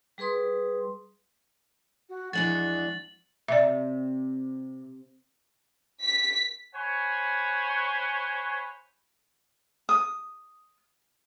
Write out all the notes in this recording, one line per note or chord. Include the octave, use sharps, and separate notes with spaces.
G3 G#4 B4 C6 D#6
F#4
E2 F3 G#3 D4 F#4 A6 F#7
C3 D5 E5
B6
C5 C#5 F#5 G#5 B5 C#6
D#6